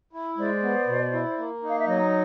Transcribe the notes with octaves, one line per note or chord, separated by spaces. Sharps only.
E4
G#3 C5 D5
B3
B2
E4
A#3
D#4
F5
E5
F#3 C#5 D#5